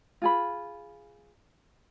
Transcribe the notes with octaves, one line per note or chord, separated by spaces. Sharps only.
F4 G#4 B5